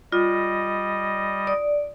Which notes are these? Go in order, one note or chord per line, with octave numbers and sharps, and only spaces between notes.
G3 F4 D#5
D5 D#6